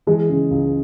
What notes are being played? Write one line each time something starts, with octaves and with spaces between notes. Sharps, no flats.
E3 G#3
C#3
C#2